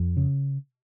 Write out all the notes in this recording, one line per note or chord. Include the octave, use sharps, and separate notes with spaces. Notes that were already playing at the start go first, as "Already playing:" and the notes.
Already playing: F2
C#3